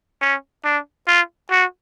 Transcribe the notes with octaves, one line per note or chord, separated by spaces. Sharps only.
C#4
D4
F4
F#4